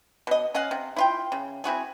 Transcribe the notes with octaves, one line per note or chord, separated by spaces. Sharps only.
B2 D#5
C#4 D#5 F5 F#5
C3
E4 F4 G5
C#3
C4 E4 F#4 G#4